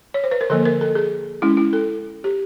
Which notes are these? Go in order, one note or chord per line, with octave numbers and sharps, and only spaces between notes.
C#5
C5
B4
A#4
D3 F3 A#3 A4
A#4
A4
G#4
G#3 C#4 E4
E4
A4
G4